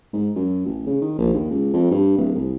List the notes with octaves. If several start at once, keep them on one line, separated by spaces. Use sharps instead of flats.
G#2
F#2
A1
C#3
D#3
A#1
D#2
C#2
F2
G2
D1
C2